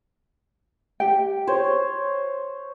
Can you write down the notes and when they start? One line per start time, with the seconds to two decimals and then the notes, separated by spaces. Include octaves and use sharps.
1.00 G4 G5
1.47 C5 C#5